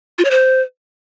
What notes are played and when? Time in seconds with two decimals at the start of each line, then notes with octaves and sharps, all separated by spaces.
0.18 F4
0.25 C#5
0.31 C5